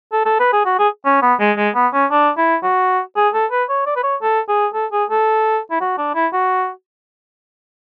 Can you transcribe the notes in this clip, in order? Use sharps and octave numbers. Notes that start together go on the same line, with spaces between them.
A4
A4
B4
G#4
F#4
G#4
C#4
B3
G#3
G#3
B3
C#4
D4
E4
F#4
G#4
A4
B4
C#5
D5
B4
C#5
A4
G#4
A4
G#4
A4
E4
F#4
D4
E4
F#4